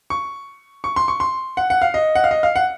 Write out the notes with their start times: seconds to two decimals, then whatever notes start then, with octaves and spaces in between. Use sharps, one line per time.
0.10 C#6
0.84 C#6
0.96 C6
1.08 C#6
1.20 C6
1.57 F#5
1.70 F#5
1.82 F5
1.94 D#5
2.15 F#5
2.24 F5
2.31 D#5
2.43 F5
2.56 F#5